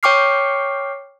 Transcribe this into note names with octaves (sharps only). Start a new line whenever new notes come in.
C#5 G5 C#6 D6 F6 C7